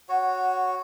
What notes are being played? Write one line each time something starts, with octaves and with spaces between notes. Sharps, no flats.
F#4 C#5 F#5